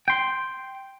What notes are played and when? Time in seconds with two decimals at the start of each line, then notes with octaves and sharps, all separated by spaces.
0.08 G5 C6